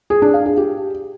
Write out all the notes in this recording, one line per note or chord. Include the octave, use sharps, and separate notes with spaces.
G#4
D4
F5
G#4
G4